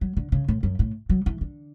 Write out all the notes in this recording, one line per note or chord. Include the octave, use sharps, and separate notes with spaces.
F#3
D3
C#3
A2
F#2
A2
F#3
E3
D3